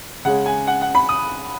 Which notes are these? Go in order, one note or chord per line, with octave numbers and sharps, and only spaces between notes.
C#3 G#3 C#4 F#5
G#5
F#5
F#5
B5
D#6